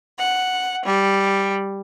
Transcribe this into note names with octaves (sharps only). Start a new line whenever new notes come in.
F#5
G3